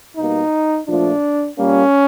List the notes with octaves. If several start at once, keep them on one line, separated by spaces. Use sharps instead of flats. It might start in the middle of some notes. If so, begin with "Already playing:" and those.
B2 G3 A#3 D#4
A#2 F3 A3 D4
A#2 G3 A#3 C#4